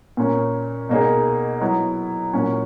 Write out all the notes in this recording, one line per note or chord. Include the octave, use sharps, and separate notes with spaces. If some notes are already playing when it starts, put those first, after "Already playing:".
A#2 A#3 C#4
B2 A#3 D#4 G#4
F#3 B3 E4
A#2 F#3 C#4